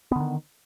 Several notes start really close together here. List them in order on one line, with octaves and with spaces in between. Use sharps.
B3 D3 D#3